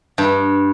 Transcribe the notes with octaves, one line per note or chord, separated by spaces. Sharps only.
G2